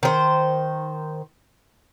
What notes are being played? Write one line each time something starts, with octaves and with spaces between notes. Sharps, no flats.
D#3 C5